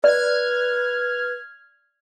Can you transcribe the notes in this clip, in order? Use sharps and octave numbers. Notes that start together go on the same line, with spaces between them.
B4 D5 F6 G#6